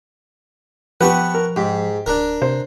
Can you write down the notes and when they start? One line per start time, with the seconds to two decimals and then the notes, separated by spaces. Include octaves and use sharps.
1.01 F3 B3 G4 B4 F#5 A5 C#6
1.34 A#4
1.56 G#2 G4
2.06 D1 D4 A#4
2.42 C3 C5